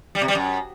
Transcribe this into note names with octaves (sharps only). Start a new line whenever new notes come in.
G3
C3
G3
F#2